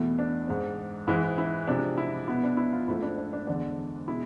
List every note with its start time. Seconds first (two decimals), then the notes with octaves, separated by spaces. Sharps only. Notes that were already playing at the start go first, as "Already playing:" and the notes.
Already playing: E2 B2 A3 E4
0.19 D4
0.47 G#2 G#3 C4
1.07 G#2 E3 G#3 C4 E4
1.38 E4
1.67 C3 F3 G#3 D4
1.98 E4
2.27 B2 B3 E4
2.43 D4
2.57 E4
2.73 F4
2.88 G#2 F3 A3 C4 E4
3.02 D4
3.18 D4
3.33 D4
3.47 E2 D3 G#3 D4
4.07 B2 G#3 E4